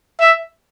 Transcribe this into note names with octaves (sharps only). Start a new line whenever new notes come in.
E5